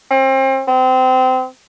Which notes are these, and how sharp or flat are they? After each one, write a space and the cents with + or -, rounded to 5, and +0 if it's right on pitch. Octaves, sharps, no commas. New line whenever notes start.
C4 +35
C4 -25